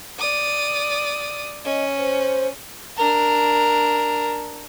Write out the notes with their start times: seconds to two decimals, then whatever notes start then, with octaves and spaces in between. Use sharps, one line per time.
0.18 D5 D#6
1.65 C#4 D#5
1.97 C5
2.97 D4 A#4